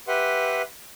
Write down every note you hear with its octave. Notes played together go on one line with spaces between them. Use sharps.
G4 B4 E5 F#5 C6